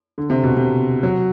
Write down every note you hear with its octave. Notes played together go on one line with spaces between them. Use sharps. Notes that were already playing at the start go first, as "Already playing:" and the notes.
D3
C3
B2
C3
F#3